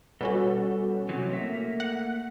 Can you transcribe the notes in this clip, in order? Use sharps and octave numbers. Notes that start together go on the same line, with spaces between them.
B2 G3 C#4 F#4 A4
C3 E3 F#3
A3 A#3 E5
F#5